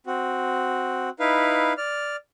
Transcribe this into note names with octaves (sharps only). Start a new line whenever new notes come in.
C4 F#4
D#4 E4 B4 F5
D5 F6